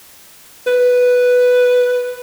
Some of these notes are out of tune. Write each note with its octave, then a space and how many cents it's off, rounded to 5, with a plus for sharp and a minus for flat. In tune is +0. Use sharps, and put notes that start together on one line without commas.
B4 +0